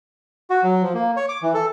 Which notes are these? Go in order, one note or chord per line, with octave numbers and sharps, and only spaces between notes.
F#4
F#3
F3
A#3
C#5
D6
E3
A4